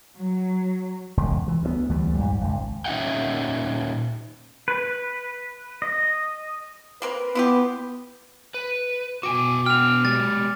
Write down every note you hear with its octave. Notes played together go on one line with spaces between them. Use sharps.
F#3
E1 C#2
E3
D2 F#3 B3
D2 E3 G3 A3
F2 G#2 G3
G#1 C#2
A#2 C#4 D#4 E5 F#5 G5
B4
D#5
A#3 C4 A#4 B4
B3 E4 F4 G4
B4
B2 F#4 G5 G#5 D6
B3 G5 F6 F7
G#3 G4 A6